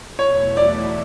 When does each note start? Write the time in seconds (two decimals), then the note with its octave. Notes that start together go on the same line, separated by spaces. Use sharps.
0.19 E2 B2 F#3 A3 E4 C#5
0.57 D5